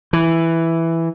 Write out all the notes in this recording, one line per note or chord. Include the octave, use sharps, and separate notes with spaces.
E3